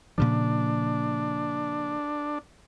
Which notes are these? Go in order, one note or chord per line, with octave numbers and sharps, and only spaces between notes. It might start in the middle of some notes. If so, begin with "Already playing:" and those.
A#2 C#3 F3 D4